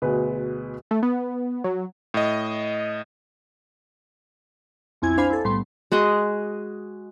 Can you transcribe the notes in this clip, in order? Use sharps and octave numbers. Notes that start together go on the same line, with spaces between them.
D2 B2 G#4 B4
A3
B3
F#3
A2 D#5
B1 F2 C4 E4 G#5 G#6
D4 C5 F5 G#5 B5 G#6
E4 A4
B1 A2 G3 B3 C6
G#3 F#4 G#4 D#5